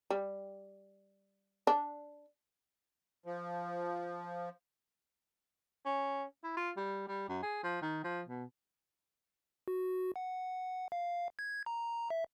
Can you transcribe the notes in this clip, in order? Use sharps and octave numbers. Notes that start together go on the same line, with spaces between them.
G3
D4
F3
C#4
E4
F4
G3
G3
F#2
G#4
F3
D#3
F3
B2
F#4
F#5
F5
G#6
A#5
E5